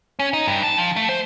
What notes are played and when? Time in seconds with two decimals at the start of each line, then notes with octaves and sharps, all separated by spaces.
0.19 C#4
0.33 D#4
0.48 G2
0.63 A5
0.77 F3
0.96 A3
1.09 C5